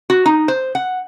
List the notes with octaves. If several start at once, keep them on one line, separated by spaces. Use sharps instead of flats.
F#4
D#4
C5
F#5